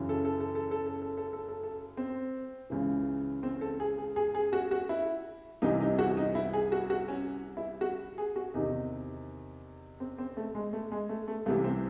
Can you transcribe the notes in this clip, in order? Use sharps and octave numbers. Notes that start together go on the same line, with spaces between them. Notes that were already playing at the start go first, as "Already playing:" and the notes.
Already playing: F#2 C#3 E3
A4
A4
A4
A4
A4
A4
A4
A4
A4
A4
A4
C4
C#2 C#3 E3
C4
A4
G#4
G#4
G#4
G#4
F#4
F#4
E4
C2 C3 E3 D#4
D#4
F#4
D#4
E4
G#4
F#4
F#4
C#4
E4
F#4
G#4
F#4
E2 C3 D#3 D#4
C4
C4
A3
G#3
A3
G#3
A3
A3
C2 C3 E3 A3
C4